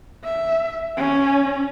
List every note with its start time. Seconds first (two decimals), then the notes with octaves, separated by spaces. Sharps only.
0.24 E5
0.97 C#4